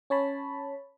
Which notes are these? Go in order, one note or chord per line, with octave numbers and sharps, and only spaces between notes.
C#4 C#5 A5 B5